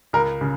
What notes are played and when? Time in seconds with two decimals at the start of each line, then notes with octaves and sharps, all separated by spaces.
0.13 C#2 A#4
0.41 C#3